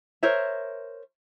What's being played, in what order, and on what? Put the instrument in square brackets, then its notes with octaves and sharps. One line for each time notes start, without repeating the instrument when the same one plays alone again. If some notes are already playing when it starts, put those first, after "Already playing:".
[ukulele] A#4 C5 C#5 E5